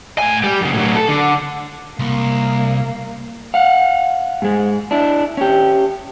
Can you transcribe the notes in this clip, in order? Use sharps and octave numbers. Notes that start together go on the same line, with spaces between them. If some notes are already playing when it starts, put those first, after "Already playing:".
A2 G#5
G3
F#2 C#3
A2 F#3
A4
D3
C2 A#3
F5 F#5
G#2 G#3
D4 E4
C#4 G4